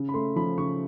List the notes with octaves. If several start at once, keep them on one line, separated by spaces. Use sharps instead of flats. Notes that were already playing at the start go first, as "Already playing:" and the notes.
Already playing: C#3
B5
A3 C6
F3 B5
C#3 C#6